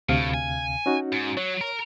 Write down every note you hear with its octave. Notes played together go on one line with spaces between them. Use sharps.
D2 A2 C3 F5
G#5
C#4 D#4 F#4
G#2
F#3 C#5
A#4